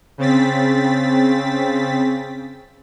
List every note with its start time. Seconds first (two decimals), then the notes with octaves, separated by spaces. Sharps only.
0.18 C#3 C4 A6 B6